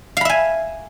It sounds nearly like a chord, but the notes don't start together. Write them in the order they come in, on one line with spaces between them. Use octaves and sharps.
F5 B5 E5 G#5